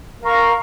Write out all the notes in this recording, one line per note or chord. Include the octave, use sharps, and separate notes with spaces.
A#4 F5 A#5 C#6